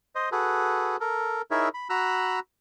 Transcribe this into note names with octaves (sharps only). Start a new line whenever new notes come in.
C5 D#5
F#4 G#4 A4 B4
A4 A#4
D#4 E4 G#4 A#4 C#5 E5
B5
F#4 A#5 B5 E6 F#6